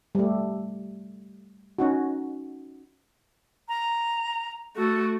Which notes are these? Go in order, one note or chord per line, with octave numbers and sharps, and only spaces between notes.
G3 A3
C#4 D#4 F#4
A#5
A3 F#4 A4